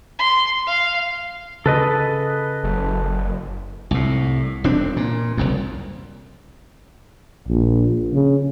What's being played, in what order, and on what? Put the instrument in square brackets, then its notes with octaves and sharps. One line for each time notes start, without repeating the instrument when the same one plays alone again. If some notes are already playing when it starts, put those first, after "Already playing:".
[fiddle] C6
F5
[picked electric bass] C#3 [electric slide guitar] A4 B4 D#5
[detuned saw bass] F#1
[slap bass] C2 A2
E1 C4 D4
A#2
F#1 C2 F2
[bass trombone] A#1
C#3